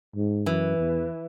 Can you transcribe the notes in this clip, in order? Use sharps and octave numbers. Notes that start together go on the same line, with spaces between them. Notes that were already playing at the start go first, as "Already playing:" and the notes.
G#2
F#2 E3
E2